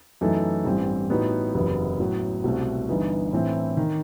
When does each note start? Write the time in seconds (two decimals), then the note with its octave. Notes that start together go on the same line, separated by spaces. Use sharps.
0.21 F#2 E3 A3 D#4 A4
0.65 A1 G2 E3 G3 C4
1.10 A2 G3 B3 D#4 F#4
1.54 F#1 E2 C3 F#3 B3
2.00 A2 F#3 B3 F#4
2.44 C2 B2 A3 C4 F#4
2.89 G1 G2 E3 B3 D#4
3.32 A2 E3 A3 C4 E4
3.77 D#3